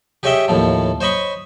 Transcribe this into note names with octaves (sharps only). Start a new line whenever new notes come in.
G4 G#4 C#5 D#5 E5 G5
D#2 A2 F3
C5 C#5 D#5 B5 C#6